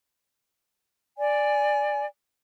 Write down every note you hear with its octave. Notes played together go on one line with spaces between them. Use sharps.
D5 G#5